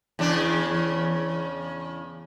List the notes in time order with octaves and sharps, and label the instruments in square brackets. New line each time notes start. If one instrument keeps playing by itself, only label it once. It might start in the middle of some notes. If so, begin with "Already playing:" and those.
[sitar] E2 C#3 D4